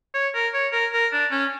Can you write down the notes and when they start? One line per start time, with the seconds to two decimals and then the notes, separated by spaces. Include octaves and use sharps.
0.14 C#5
0.34 A#4
0.54 C#5
0.72 A#4
0.93 A#4
1.12 D4
1.31 C#4